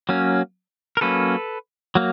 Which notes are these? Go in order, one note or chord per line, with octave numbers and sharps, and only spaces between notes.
F#3 A#3 C#4
A#4
F#3 A#3 C#4 A4 B4
F#3 A#3